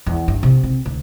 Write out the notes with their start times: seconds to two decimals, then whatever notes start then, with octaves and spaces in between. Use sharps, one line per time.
0.06 E2
0.28 G2
0.43 C3
0.63 C4
0.86 D2